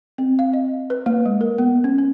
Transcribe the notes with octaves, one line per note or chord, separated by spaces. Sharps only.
C4
F5
D#5
B4
A#3
G#3
A#4
B3
C#4
C#4